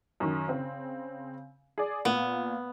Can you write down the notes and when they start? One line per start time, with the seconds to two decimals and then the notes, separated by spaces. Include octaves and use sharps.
0.20 F#2 D#3
0.48 C#3 C4
1.78 G#4 D5
2.05 A#2 B3